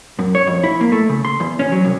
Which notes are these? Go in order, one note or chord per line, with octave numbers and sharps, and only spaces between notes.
F#2
C#5
F2
E4
A#3
A3
C#3
C6
E2
C#4
F#3
C2